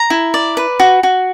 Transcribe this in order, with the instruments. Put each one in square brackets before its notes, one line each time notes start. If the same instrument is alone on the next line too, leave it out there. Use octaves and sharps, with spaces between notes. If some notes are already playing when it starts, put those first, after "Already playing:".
Already playing: [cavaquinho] A#5
E4
D5
B4
F#4
F#4